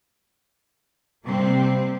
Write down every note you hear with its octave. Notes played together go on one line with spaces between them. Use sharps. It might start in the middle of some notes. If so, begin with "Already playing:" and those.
C3 G3 A#3 C4